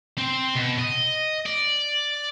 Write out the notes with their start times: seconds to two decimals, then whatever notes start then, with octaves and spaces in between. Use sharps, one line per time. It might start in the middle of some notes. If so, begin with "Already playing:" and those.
0.18 C4
0.55 B2
0.79 D#5
1.46 D5